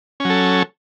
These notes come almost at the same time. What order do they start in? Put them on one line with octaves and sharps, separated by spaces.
C#4 F#3 A4